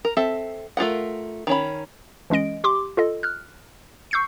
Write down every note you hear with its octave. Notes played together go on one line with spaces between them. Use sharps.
A#4
C4 A4 E5
A3 F4 A#4 F#5
D#3 C#4 B5
E3 G#3 C#4 D#5 D7
G4 C6 D6
F4 A4 D#5
F6 F#6
C#6 E6 G6 C7 C#7